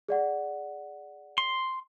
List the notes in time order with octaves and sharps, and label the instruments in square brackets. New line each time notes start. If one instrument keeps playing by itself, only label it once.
[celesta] G#4 D5 F#5
[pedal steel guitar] C6